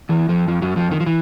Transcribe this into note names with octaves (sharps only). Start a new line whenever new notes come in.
E2 E3
F2 F3
F2 F3
F#2 F#3
F2 F3
D#3
F3
E3